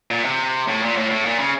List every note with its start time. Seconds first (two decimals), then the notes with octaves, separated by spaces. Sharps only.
0.11 A#2
0.25 C3
0.68 A2
0.82 A#2
0.96 A2
1.10 A2
1.26 A#2
1.39 C#3